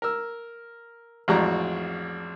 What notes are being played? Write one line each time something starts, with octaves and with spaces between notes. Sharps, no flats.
A#4 E6
A1 F2 G#3 F#4 D5 A#5